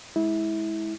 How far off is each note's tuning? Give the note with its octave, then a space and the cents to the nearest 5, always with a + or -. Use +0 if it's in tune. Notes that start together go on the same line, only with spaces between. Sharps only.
G#3 +15 E4 -20